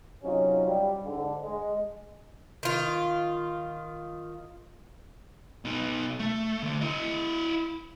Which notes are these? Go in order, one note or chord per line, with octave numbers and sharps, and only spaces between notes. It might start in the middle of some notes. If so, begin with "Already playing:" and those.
C3 F#3 C#4 D#4 F4
G3
G#2 D3
G#3
D#3 F4
B2 D#4
A3
D3 A3
E4 D#5